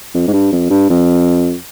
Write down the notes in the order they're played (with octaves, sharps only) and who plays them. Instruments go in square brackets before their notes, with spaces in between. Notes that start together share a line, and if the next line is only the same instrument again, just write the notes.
[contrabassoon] F2
G#2
G2
F2
G2
F2